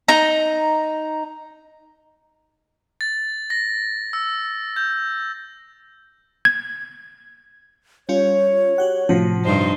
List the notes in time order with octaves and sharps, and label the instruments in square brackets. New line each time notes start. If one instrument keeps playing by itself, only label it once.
[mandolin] D#4 A#5
[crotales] A6
A#6
E6
G6
[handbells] G#6
[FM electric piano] G3 C#4 F4 [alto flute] C#5
[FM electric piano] F#4 G4 F#5
[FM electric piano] A2 C3 F#4 [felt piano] F3
[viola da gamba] G2 D#4 C5